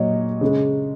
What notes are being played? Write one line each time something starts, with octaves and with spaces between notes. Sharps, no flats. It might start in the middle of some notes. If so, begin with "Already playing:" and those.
Already playing: A#2 F#3 C#5 D#5
C#3 G#3